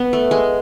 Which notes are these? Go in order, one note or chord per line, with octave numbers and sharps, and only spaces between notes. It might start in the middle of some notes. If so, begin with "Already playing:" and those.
Already playing: B3
A3
G#3